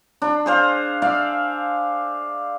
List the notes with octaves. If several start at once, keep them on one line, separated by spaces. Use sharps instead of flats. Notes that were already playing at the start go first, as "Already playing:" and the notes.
D4 C6
G#4 C5 F5
D5 E5 F5